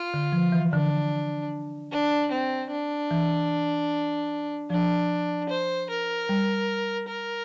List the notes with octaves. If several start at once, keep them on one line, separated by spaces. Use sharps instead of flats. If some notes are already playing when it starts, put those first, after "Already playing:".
Already playing: F4
D3
F3
E3
D3 D4
D4
C4
D4
E3
F3 D4
C5
A#4
G3
A#4